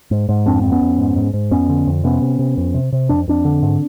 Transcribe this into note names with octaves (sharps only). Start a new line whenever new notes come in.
G#2
G#2
F2 C4 D4
F2 C4
B3 C#4
F2
G#2
G#2
G#2
F2 B3 C#4
D3
F2
C3 B3 C#4
C3
C3
F2
C3
C3
F2 D4
F2 C4 D4
D3
G#2